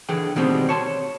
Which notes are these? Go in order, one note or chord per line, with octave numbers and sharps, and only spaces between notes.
D3 E3 G#4 G5
B2 D#3 G3 G#3 B3 C4
C#5 A5 C6